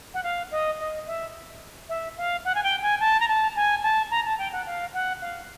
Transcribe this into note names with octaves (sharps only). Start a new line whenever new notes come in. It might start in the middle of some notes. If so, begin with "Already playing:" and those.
F#5
F5
D#5
D#5
E5
E5
F5
F#5
G#5
G5
G#5
A5
A#5
A5
G#5
A5
A#5
A5
G5
F#5
F5
F#5
F5